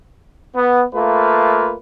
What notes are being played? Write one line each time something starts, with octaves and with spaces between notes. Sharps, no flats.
B3
A3 A#3 F4 B4